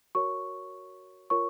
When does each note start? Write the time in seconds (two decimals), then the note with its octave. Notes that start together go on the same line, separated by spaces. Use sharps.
0.15 F#4 A#4 C#5 C#6
1.30 F4 A#4 C#5 C#6